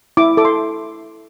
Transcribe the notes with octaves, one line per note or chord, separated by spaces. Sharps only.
E4 D6
A4 D6
C6